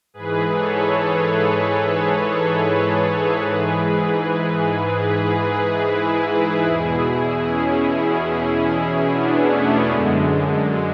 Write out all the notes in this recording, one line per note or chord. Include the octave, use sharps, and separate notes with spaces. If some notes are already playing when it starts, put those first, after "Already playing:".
G#2 E3 G#4 B4
A4 C#5
A4 C#5
G#4 B4
G#2 E3
G#4 B4
G#4 B4
E4 G#4
E2 B2 E4 G#4
E4 G#4
C#4 E4
B3 D4
A3 C#4
F#2 D3 G#3